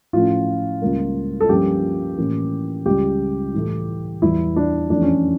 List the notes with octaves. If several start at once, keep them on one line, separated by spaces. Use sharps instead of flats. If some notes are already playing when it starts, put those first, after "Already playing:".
A2 F3 A3 C#4 F4
C#2 C#3 G3 A#3
A4
G2 F3 A#3 C#4 G4
A2 E3 A#3 C#4
C#2 C#3 G3 G4
A2 E3 A3
E2 E3 G3 E4
D4
F2 E3 A3 C#4 D4
C#4